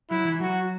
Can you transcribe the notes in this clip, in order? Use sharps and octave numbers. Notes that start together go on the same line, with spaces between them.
F#3 E4
E3
F#3 F#4